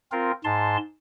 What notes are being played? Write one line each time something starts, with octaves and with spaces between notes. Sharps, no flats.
C4 F4 A#4
G#2 A5 C6